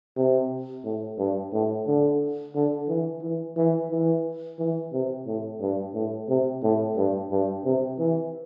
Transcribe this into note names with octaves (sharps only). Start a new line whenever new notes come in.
C3
A2
G2
A2
D3
D3
E3
E3
E3
E3
E3
C3
A2
G2
A2
C3
A2
G2
G2
C3
E3